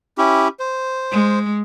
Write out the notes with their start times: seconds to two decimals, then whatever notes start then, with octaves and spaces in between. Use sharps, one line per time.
0.18 C#4 E4 G4
0.59 C5
1.12 G#3